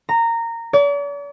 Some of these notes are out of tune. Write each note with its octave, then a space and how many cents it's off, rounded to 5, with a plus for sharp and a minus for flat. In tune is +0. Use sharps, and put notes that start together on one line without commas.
A#5 -15
D5 -45